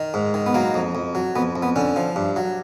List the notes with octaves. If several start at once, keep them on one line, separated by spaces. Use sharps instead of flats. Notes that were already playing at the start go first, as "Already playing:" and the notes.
Already playing: D#3
G#2
D#3
B3
F#3 A#3
F2
F2
F#3
F2 B3
F2
B3
D3 C#4
F3
G2
F#3